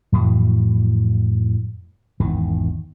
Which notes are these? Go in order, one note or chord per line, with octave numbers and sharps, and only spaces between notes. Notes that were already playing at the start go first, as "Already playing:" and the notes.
F2 A2 E3 F#3
G#1 E2 D#3